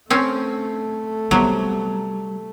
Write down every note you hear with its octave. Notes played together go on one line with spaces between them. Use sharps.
A3 C4 C#4
C3 F#3 G3 B3